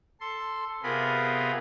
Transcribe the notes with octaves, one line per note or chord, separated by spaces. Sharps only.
A4 C6
C3 B3 F4 G#4 A#4 B5